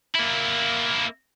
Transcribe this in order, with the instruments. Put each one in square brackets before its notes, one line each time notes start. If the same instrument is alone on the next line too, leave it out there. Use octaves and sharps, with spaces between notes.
[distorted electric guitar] A#3 E4